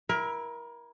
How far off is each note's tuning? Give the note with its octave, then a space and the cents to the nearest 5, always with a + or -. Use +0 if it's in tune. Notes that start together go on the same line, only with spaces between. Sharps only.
E4 +0 A#4 +25